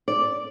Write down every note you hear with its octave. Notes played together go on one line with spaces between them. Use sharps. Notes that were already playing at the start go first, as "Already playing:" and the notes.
D5